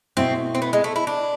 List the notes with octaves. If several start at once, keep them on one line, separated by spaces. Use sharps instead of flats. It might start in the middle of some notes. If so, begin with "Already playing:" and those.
B2 A3 C4 E4
C4
B3
G#3
A3
E4
D4